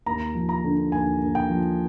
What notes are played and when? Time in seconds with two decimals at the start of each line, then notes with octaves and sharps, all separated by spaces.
0.06 D#2 A#5
0.35 F3
0.49 A#5
0.64 D3
0.92 D#2 G#5
1.21 D#2
1.35 G5
1.50 F3